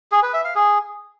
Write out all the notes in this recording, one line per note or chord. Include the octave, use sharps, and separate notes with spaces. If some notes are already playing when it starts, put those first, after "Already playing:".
G#4
B4
E5
F5
G#4